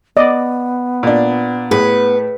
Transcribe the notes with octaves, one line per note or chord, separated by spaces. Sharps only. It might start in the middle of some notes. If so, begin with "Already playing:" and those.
B3 D5 D#5
A#2 D4
A2 G#4 B4